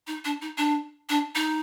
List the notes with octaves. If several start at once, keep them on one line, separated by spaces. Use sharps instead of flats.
D#4
D4
D#4
D4
D4
D#4